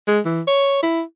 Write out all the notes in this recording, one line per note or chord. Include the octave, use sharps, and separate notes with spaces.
G#3
E3
C#5
E4